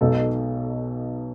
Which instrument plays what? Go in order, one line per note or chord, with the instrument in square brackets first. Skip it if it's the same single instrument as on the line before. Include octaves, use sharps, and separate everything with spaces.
[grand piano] B1 B2 G#3 D#4 A4